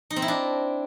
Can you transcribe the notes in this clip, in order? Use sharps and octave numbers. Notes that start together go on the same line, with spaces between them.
D#4
C4
E4
D4